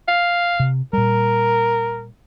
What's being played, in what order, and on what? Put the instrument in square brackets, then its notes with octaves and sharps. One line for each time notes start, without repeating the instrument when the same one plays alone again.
[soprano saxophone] F5
[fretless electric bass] C3
[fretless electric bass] A#2 G3 [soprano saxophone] A#4